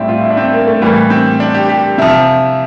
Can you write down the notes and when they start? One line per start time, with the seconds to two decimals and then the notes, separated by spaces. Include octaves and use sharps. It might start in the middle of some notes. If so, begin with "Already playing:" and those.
Already playing: A2 G3 C4 D4 E4
0.08 F4
0.24 E4
0.30 D4
0.37 C4
0.53 A#3
0.67 A3
0.81 A2 E3 G3 A#3
1.10 C4
1.40 D4
1.55 G4
1.69 G4
1.98 C3 F3 E4